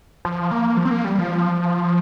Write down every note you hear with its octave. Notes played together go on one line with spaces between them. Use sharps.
F3
A#3
F3
C4
A#3
G3
F3